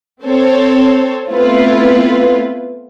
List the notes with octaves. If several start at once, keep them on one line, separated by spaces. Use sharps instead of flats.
C4 A4 C5 C#5
A3 B3 C4 E4 F4 B4